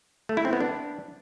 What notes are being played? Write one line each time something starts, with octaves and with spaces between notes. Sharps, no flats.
A3
E4
C4
B3
D4